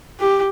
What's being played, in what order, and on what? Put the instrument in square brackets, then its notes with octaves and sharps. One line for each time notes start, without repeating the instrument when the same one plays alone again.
[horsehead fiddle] G4